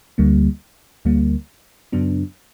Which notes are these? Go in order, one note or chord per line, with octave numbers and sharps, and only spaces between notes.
D2 D3 G3 A#3
D2 D3 G3 A#3
F#2 C#3 F#3 B3 D4